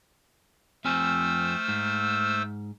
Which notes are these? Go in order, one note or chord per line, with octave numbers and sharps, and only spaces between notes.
F2 A3 C4 C5 G#5 E6 F6
G#2